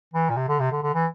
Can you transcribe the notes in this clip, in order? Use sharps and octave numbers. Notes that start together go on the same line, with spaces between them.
E3
A#2
C3
D3
C3
D3
D3
E3